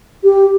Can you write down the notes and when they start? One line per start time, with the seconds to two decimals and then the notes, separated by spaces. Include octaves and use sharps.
0.24 G4